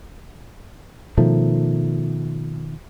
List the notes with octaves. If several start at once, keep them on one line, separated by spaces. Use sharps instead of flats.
B2 D#3 F3 A3